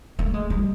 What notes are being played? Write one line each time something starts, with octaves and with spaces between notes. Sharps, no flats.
A3
G#3
G3